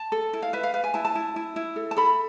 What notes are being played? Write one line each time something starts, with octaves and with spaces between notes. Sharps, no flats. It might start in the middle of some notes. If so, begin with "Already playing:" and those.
Already playing: A5
A4
E4
F5
B4 E5
F5
B4 F5
G#5
E4 A5
A5
E4
E4
E4
A4
A5
A4 B5